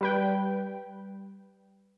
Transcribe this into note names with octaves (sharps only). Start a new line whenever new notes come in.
G3 B4 G5